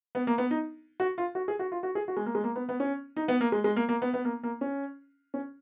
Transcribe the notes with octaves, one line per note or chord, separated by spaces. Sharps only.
B3
A#3
B3
D#4
F#4
F4
F#4
G#4
F#4
F4
F#4
G#4
F#4
G#3
A#3
G#3
A#3
B3
B3
C#4
D#4
B3
A#3
G#3
G#3
A#3
A#3
B3
B3
A#3
A#3
C#4
C#4